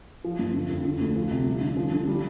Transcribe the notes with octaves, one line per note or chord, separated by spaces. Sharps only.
F3
G2
D3
F2
D3
D2
F3
C3
G3
D3
F3
D3
G3